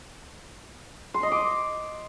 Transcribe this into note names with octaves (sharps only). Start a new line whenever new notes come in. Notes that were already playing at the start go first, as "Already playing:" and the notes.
C6
D#5
D6